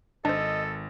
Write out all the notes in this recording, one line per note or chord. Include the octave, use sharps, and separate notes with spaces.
G#1 D4 A4 C5 D#5